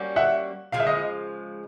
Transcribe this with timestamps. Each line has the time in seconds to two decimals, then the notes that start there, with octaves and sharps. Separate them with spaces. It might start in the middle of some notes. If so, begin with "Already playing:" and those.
Already playing: G3 A#3 C#4 F#4
0.16 E5 F#5
0.72 C#3 F3 G#3 F5
0.80 E5
0.87 D#5 F5